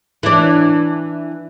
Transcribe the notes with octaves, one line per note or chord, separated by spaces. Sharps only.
E3 D4